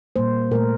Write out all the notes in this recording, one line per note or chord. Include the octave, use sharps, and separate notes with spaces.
A#2 G3 A#3 C5
A#2 A3 A#4